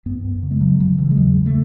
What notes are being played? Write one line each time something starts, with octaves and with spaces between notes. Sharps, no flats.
F#2 B3
F#2
C#3
G#3
C#3 F#3
C#3 F#3
C#3 E3
G#3
E2 F#3
C#3
A3